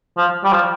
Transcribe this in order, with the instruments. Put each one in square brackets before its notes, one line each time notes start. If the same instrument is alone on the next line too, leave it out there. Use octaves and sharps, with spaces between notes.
[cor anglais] F3
G3
F3